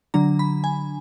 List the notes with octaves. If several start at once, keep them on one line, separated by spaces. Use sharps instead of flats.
D3 F#3 D4 A#5
B5
G#5